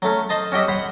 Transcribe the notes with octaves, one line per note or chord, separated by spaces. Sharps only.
F#3 A3 C#4
C5 D#5 A5
C#4 F#4 G4 D#5 E5
C5 C#5 F#5 B5 C6